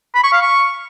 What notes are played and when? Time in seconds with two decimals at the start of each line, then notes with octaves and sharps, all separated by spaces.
0.15 B5
0.24 C#6
0.32 F5
0.41 C#6